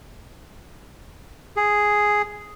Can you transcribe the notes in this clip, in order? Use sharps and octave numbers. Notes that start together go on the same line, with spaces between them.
G#4